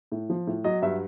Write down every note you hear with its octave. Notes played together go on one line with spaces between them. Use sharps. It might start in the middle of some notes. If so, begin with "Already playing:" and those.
A2
F3
A2
F#3 D#5
G2 E5